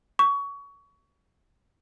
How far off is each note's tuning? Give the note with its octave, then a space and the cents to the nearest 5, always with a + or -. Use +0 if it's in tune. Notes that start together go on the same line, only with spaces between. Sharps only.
C#6 +25